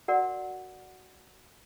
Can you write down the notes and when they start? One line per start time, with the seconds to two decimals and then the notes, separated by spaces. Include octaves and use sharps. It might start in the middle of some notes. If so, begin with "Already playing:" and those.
0.08 F#4 A#4 D5 F#5